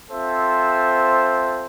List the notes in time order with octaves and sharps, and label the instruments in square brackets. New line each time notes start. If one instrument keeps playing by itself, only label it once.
[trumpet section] C4 F4 A4 C5 E5